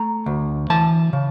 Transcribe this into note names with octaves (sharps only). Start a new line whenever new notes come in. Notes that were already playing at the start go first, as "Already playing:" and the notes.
Already playing: A3 A#5
D2
E3 A5
C#3